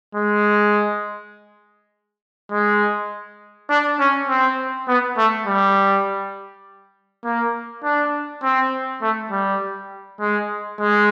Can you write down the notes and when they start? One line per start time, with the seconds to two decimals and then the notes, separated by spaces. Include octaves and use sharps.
0.15 G#3
2.52 G#3
3.70 D4
3.99 C#4
4.29 C4
4.88 B3
5.17 A3
5.47 G3
7.24 A#3
7.84 D4
8.43 C4
9.02 A3
9.31 G3
10.20 G#3
10.79 G#3